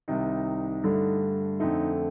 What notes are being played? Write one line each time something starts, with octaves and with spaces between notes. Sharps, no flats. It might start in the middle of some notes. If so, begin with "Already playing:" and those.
C2 C3 D#3 D#4
G2 D3 A3
F2 D3 A3 D#4